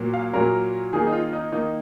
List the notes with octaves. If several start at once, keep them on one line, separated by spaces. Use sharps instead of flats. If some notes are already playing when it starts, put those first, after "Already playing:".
Already playing: A#2 F#3 A#3
F5
A#2 F#3 A#3 A#4
D#3 A#3 G#4
D#4
F4
D#4
D#3 A#3 D#4